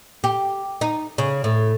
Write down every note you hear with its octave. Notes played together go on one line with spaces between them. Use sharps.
G4
D#4
C#3
A2